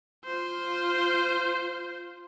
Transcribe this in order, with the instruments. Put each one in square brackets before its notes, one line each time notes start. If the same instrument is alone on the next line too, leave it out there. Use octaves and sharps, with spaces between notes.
[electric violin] F4 C5